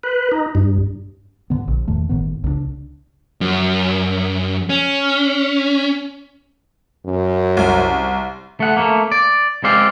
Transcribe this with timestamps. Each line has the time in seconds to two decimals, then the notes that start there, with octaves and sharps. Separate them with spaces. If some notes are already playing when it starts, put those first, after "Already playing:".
0.03 B4
0.31 D#4
0.55 G2
1.50 G#2 D3 B3
1.68 A#1
1.88 E2 A2 D#3 A3
2.09 G1 A2 D#3 B3
2.44 C#2 C#3 A3 D4
3.41 F#2
4.69 C#4
7.06 F#2
7.57 C2
8.60 A3 F#5
8.77 A3 A#3
9.12 D5
9.64 G#3 C4 D5 F5